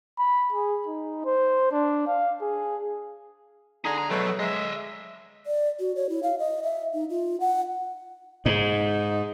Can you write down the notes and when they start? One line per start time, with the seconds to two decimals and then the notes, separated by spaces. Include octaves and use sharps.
0.18 B5
0.53 G#4
0.87 D#4
1.25 C5
1.72 D4
2.07 F5
2.42 G#4
3.85 D3 D#4 G#4 A#5
3.98 C#2 A#5
4.10 B2 F#3 A3
4.39 G#3 D#5 E5
5.46 D5
5.80 F#4
5.96 C#5
6.09 E4
6.23 F5
6.39 D#5
6.63 E5
6.94 D#4
7.10 F4
7.40 F#5
8.46 G#2 D#4